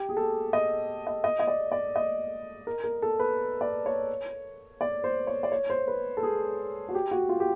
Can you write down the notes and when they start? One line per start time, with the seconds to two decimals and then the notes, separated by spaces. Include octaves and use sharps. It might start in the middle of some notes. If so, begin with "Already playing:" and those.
Already playing: G4
0.09 G#4
0.17 A4
0.53 D#5
1.07 D#5
1.24 D#5
1.40 D#5
1.47 D5
1.72 D5
1.96 D#5
2.67 A#4
2.84 A#4
3.02 A4
3.20 B4
3.61 D5
3.86 C#5
4.81 D5
5.04 C5
5.27 C#5
5.43 D5
5.52 C#5
5.70 C5
5.88 B4
6.17 A4
6.23 G#4
6.89 F#4
6.95 G4
7.11 F#4
7.29 F4
7.40 G4